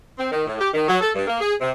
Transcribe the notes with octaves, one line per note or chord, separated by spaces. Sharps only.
C4
D#3
A2
G4
D#3
F#3
A4
G2
A#3
G#4
C3